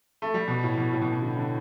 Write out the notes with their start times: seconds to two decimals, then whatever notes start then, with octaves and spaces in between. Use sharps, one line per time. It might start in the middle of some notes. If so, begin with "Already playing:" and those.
0.22 A3
0.34 G3
0.48 B2
0.63 A2
0.78 B2
0.92 A2
1.02 B2
1.12 B2
1.22 D3
1.37 D3